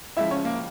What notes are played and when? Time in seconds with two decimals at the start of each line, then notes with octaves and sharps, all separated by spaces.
0.17 C#2 C#3 F3 E4 E5
0.30 C#4 C#5
0.45 A#3 A#4